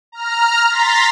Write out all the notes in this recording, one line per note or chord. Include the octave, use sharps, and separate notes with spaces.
A#5 F6
A#5 C6 A6 B6